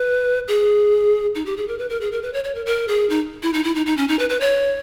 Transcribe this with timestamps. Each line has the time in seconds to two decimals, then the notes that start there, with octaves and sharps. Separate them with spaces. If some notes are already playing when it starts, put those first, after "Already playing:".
Already playing: B4
0.48 G#4
1.35 D#4
1.46 G4
1.57 G#4
1.68 A#4
1.78 B4
1.89 A#4
2.01 G#4
2.12 A#4
2.22 B4
2.33 C#5
2.44 C#5
2.55 A#4
2.66 A#4
2.88 G#4
3.10 D#4
3.43 E4
3.53 D#4
3.64 E4
3.75 D#4
3.86 D#4
3.97 C#4
4.08 D#4
4.19 B4
4.29 B4
4.40 C#5